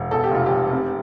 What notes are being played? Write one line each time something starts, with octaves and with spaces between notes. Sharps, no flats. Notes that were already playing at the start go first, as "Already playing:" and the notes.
Already playing: E1
E2 A4
G4
F1 F4
G4
F1
C3